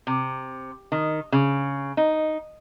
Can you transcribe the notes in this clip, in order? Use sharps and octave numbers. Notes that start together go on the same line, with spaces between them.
C3
D#3
C#3
D#4